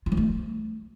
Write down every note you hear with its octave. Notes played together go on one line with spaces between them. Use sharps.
F4
F3
A3